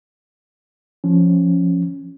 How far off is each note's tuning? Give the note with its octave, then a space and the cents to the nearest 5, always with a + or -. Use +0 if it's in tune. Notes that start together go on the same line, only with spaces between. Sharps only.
F3 +0 C#4 +0